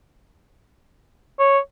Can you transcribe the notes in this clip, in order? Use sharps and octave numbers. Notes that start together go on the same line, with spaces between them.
C#5